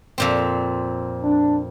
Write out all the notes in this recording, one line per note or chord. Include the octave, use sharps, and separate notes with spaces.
F2 A#2 C4
D4